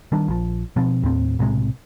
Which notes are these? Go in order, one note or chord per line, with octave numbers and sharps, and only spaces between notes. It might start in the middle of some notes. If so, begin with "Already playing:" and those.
D#3 G3 D4
A#1 F3
B2 F3 C4
D#2 A2 C4
B1 A2 C3 G#3